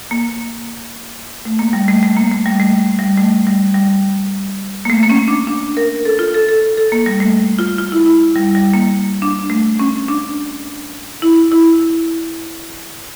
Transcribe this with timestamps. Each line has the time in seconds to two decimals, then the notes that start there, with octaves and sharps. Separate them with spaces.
0.11 A#3
1.45 A3
1.59 A#3
1.73 G3
1.88 A3
2.03 A3
2.17 A#3
2.31 A3
2.46 G3
2.60 A3
2.99 G3
3.18 A3
3.47 G3
3.74 G3
4.85 A#3
4.90 A3
5.03 A#3
5.10 C#4
5.28 D4
5.47 D4
5.77 A#4
6.05 A4
6.19 F4
6.34 A4
6.49 A4
6.77 A4
6.92 A#3
7.06 G3
7.20 A3
7.59 F4
7.78 F4
7.92 E4
8.06 E4
8.36 G3
8.55 G3
8.73 A#3
9.22 D4
9.50 A3
9.79 C#4
10.08 D4
11.22 E4
11.52 E4